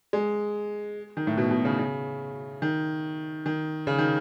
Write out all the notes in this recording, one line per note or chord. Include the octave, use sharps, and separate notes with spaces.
G#3
D#3
A2
B2
B2
C#3
C#3
D#3
D#3
C#3
D#3